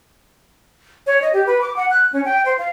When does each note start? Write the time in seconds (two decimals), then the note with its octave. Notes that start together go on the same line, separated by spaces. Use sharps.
1.07 C#5
1.22 D#5
1.33 G4
1.47 B4
1.61 D6
1.76 F#5
1.91 F#6
2.13 C#4
2.25 G5
2.45 C5
2.58 F5